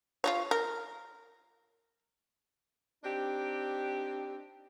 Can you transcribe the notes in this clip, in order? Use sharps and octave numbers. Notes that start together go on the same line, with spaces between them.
F4 G4 C#5
A#4
C4 D4 D#4 G4